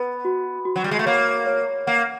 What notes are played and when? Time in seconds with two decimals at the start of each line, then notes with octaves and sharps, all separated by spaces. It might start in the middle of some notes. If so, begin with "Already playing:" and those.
Already playing: B3 B4
0.25 F#4
0.65 F#4
0.76 F#3
0.84 G3
0.91 G#3
0.99 A3
1.06 A#3 C#5
1.46 C#5
1.87 A#3 F#5